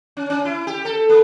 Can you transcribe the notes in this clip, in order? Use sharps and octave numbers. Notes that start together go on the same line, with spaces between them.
C#4
C#4
E4
G4
A4
A#3